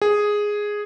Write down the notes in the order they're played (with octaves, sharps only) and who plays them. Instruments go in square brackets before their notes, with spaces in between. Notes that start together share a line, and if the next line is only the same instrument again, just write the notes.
[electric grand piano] G#4